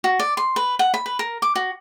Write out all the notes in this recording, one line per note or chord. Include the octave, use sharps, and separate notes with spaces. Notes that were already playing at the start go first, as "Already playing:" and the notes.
F#4
D5
C6
B4
F#5
B5
B4
A#4
D6
F#4